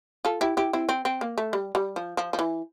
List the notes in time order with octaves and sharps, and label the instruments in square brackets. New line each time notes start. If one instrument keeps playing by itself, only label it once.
[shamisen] F4 A4
E4 G4
E4 G4
C4 E4
C4
C4
A#3
A3
G3
G3
F3
F3
F3
E3